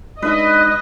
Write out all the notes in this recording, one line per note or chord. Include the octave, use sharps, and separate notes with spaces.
G#3 D4 D#4 B4 D#5 E5